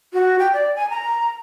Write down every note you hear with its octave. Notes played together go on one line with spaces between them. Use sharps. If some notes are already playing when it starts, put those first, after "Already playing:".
F#4
G5
D5
G#5
A#5